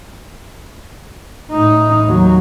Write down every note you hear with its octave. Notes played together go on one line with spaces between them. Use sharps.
A2 D#4
D#2 F#3